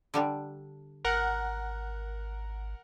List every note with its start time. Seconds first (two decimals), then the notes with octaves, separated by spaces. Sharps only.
0.14 D3 G3 D4
1.05 G#1 A#4 F#5